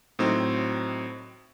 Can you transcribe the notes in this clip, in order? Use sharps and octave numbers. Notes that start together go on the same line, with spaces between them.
A2 F#3 C4 D#4